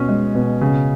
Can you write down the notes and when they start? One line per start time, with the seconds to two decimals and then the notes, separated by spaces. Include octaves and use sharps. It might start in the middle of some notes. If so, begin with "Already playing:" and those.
Already playing: B2 C#4
0.09 G#3
0.35 B2
0.61 C#3